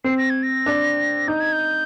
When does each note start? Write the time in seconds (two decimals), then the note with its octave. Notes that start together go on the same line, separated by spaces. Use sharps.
0.04 C4 C7
0.18 A#6
0.30 G#6
0.43 A#6
0.66 D4
1.28 D#4 G6
1.40 G#6
1.52 G6